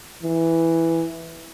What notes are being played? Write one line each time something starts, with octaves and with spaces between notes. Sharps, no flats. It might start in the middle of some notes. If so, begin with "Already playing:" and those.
E3